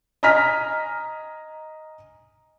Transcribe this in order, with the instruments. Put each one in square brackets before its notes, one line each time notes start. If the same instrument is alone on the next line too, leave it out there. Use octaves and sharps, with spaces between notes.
[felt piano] D#5 G#5 A#5 F6 B6